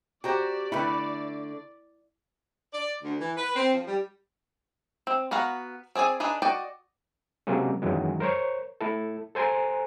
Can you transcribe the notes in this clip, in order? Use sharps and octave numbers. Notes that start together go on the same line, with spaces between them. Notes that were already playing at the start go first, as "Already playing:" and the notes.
F#4 G4 C5 D5 G5 A#5
D3 A3 E4 B4 G5 B5
D5
D2
E3
B4
C4
F3
G3
C4
B3 F#4 F5 A#5
C4 G#4 D5 G#5
D4 D#4 G#4 B4
F#4 D5 D#5 G5
C3 F#3 G#3 A#3 C4 C#4
F#2 D#3 E3 F#3 G#3
A#4 C5 C#5
A3 E4 A4
A4 C5 G#5 A#5 C6